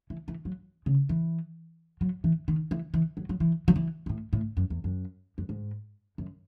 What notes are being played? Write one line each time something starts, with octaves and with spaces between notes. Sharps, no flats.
E3
E3
F#3
C#3
E3
F#3
E3
D#3
E3
E3
F#3
F#3
E3
F#3
E3
B2
A2
A2
F#2
E2
F#2
F#2
G#2
F#2